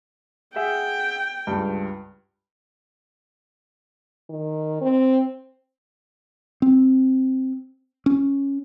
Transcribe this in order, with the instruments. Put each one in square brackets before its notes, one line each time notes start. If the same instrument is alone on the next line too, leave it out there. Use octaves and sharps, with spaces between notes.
[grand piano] G#4 E5 F#5 [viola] G5
[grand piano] C#2 G2
[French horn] D#3
C4
[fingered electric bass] C4
C#4